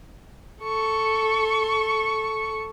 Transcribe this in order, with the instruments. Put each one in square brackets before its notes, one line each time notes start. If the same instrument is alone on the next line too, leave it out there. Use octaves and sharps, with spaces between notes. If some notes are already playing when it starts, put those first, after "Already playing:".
[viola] A4 C#6